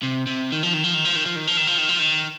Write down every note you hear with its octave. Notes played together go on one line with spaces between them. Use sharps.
C3
C3
D#3
F3
D#3
F3
D#3
F3
D#3
F3
D#3
F3
D#3
F3
D#3
F3
D#3